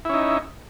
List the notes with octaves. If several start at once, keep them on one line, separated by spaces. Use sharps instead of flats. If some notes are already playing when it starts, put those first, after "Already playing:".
C#4 D#4 E4